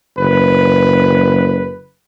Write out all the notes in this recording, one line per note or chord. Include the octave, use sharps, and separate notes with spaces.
F#1 B4